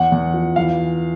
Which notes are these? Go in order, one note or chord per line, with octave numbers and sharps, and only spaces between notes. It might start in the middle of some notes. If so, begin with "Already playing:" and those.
Already playing: E2 F#5
E2
F3
E3 F5